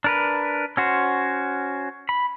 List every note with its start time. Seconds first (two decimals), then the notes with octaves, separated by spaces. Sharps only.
0.04 D4 A#4 B4
0.77 C#4 F#4 C5
2.09 B5